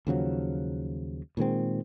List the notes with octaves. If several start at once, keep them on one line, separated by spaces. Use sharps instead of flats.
D#2 C#3 F3 F#3
A#2 D#3 G#3 C4